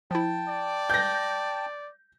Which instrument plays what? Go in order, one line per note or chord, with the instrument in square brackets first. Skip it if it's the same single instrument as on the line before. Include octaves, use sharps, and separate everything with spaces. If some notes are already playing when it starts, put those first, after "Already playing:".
[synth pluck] F3 E4 [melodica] G5 A5
[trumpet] D5
[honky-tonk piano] G6 A#6